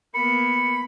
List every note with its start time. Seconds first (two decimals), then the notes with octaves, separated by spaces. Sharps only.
0.14 A#3 B3 B5 C#7